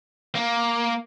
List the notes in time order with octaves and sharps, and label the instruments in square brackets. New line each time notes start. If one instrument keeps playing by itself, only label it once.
[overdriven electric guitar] A#3